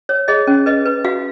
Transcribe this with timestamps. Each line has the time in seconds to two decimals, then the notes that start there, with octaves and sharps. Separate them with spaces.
0.09 C#5
0.28 G#4 D#5
0.47 C#4
0.66 B4 D#5
0.86 B4
1.05 F#4 F5